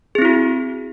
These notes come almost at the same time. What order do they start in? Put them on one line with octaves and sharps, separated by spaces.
G#4 C4 E4 F#4